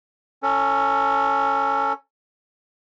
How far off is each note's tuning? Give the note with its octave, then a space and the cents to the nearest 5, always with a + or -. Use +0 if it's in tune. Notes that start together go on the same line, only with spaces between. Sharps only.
C#4 +0 A4 +20